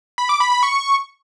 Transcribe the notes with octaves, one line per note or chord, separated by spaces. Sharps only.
B5
D6
B5
B5
C#6